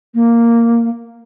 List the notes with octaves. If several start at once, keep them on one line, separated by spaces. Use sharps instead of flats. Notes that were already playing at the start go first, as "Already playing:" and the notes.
A#3